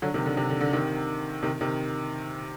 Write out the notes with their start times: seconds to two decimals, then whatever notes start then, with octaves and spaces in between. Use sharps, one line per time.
0.02 D3 F#3
0.14 C3 D#3
0.26 D3
0.37 C3
0.50 D3
0.61 D3
0.73 C3 D#3
1.43 C3 D#3
1.61 C3 D#3